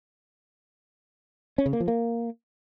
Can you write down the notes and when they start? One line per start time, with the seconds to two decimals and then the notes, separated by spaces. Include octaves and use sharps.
1.58 C#4
1.66 C#3
1.73 A#3
1.80 F3
1.88 A#3